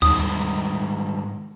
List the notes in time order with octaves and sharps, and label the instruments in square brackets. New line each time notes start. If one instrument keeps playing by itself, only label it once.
[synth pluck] D#2 [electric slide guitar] G#2 D#3 G3 [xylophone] D#6